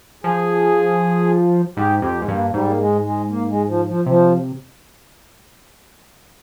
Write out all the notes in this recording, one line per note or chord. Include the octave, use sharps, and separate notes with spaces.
F3 G#4
G#2 G4
F2 G4
G#2
G2 A#3
G#2 G3
A#3
G#3
G#3
A#3
G#3
F3
F3
C3 F3